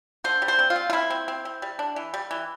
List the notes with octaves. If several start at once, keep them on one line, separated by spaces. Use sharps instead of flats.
D3 C5
G3
C5
C4
F4
C4
F4
C4 E4
C4
C4
C4
G3
D4
E3
G3
E3